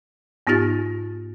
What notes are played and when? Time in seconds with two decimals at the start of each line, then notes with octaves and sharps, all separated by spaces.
0.47 G#2 B3 D#4 F4 G4 A6